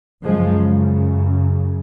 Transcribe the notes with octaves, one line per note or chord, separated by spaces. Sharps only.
F#2 C#3 F3 G#3